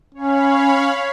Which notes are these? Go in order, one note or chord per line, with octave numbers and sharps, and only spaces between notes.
C#4 C#5 F5 B5